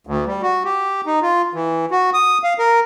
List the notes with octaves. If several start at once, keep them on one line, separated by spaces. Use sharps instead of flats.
D2
G3
F#4
G4
D#4
F4
E3
F#4
D#6
F5
A#4